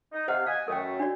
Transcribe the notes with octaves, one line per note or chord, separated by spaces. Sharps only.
D#4
C3 C5 D#5 F5 F#5
D#5 F5 F#5 G#5
F#2 A3 A#4 G5
D4 F#4 D5